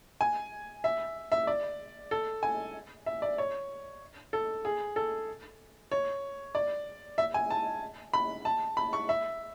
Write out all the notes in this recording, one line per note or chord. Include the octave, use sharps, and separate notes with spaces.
G#5
E5
E5
D5
A4
G#5
E5
D5
C#5
A4
G#4
A4
C#5
D5
E5
G#5
A5
B5
A5
B5
C#6
E5